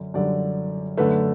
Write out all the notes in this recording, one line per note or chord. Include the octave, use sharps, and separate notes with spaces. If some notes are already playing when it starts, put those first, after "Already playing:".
Already playing: F#2 D3
F#2 D3 G3 D5
F#2 D3 A3 B4